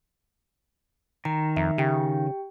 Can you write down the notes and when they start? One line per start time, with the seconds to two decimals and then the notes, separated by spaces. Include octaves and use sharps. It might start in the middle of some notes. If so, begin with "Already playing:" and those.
1.25 D#3 A#5
1.57 F2 E5
1.78 C#3 G4 G5